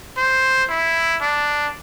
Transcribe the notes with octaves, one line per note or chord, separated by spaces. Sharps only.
C5
E4
D4